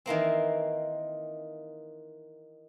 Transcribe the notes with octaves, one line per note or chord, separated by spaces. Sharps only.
D#3 E3 A#3 C4